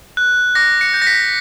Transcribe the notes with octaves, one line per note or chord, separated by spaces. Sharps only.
F#6
D6 A#6
C#7
G6
A#6
B6